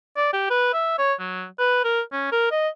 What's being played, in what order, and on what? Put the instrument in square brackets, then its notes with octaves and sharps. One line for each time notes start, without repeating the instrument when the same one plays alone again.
[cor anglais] D5
G4
B4
E5
C#5
F#3
B4
A#4
C#4
A#4
D#5